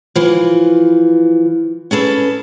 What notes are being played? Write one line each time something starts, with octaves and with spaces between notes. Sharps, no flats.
E3 F3
C#4 G#4 A4 B4